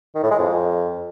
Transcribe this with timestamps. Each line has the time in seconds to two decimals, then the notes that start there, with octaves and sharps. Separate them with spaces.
0.15 D#3
0.23 A2
0.31 G#3
0.39 F2